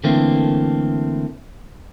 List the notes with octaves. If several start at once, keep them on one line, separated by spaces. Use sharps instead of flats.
D3 E3 A3 A#3 C4